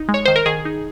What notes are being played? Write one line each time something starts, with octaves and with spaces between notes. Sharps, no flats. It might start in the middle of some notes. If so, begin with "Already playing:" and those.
Already playing: D#4
G#3
C#5
D#3 C5
A#4
D#3 G#4
D#4